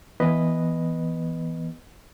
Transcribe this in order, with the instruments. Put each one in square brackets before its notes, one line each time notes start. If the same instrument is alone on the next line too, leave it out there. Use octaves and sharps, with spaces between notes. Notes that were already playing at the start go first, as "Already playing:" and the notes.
[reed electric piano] E3 B3 B4 D#5